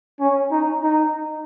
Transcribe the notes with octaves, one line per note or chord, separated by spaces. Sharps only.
C#4
D#4
D#4